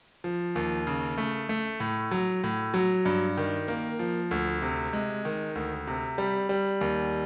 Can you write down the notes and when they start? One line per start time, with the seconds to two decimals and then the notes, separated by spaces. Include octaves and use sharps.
0.24 F3
0.55 D#2
0.87 C#3
1.18 A3
1.49 A3
1.80 A2
2.11 F#3
2.44 A2
2.74 F#3
3.05 G2
3.37 D#3
3.68 A#3
3.99 F3
4.31 D2
4.62 C3
4.93 G#3
5.25 D#3
5.55 D2
5.87 C3
6.18 G3
6.49 G3
6.81 D#2